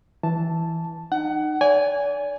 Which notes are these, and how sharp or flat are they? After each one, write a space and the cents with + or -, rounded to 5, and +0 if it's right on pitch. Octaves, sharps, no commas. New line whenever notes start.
E3 +0 A5 +0
D#4 -30 F#5 +25
D5 -40 G#5 -10